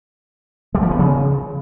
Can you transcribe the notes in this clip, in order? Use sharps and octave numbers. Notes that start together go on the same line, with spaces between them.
G3
F3
B3
C#3